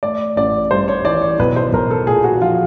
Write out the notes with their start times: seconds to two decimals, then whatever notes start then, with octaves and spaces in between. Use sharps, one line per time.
0.03 A3 D5
0.36 A1 D5
0.71 G2 C5
0.88 C#5
1.05 E3 D5
1.22 C#5
1.39 B1 B4
1.56 C5
1.73 B1 A#4
1.91 A4
2.07 A#2 G#4
2.24 F#4
2.41 F3 F4